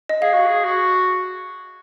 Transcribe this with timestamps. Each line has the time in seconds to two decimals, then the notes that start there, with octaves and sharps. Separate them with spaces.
0.09 D#5
0.22 G#4 F5
0.34 F#4
0.47 G#4
0.65 F#4